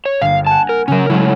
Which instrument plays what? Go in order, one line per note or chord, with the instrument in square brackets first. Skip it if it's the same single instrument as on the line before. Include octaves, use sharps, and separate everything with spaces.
[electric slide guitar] C#5
[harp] G1 A#3 [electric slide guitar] F5
[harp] F#5 G#5 [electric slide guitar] A5
[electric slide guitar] A#4
[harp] C#3 F#3 [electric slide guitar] C#4 A#4
[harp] F#3 C#4 [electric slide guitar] G#3 A3 E4